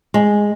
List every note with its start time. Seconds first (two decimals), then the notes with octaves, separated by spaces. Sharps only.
0.14 G#3